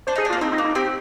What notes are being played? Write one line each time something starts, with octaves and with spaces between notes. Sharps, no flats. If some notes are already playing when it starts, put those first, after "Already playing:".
D4 C5
D#4 G#4
D4
A#3 F4
C4 D#4
D#4
A#3
D#4
C4 G4